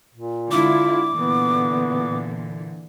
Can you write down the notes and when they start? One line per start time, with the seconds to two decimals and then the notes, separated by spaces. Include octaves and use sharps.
0.15 A#2
0.51 D3 G#3 E4 F4 D6
1.13 A#2 D3 E3 B3